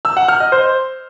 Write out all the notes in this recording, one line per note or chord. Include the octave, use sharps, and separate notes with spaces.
E6
F#5
F6
D#5
C5